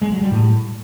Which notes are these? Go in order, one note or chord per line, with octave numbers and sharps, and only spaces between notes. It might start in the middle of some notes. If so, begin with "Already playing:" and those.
G#3
F#3
G3
A2